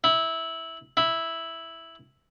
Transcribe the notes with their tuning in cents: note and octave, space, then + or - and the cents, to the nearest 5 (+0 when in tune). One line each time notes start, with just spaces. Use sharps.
E4 -15
E4 -5